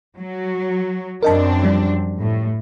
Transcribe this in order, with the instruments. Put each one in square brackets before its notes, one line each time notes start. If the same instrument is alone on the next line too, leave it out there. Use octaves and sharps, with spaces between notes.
[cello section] F#3
[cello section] F#2 C4 D4 [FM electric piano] A#4 D#5 A5
[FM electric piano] F3 G3
[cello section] A2